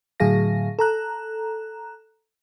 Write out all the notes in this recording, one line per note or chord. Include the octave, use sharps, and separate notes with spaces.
A2 D3 F#3 G#4 F5 A#6
A4 A#5 F#6